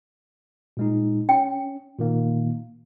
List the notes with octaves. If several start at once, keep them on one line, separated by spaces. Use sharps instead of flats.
A#2 G#3 D#4
C#4 G5
A#2 D#3 A#3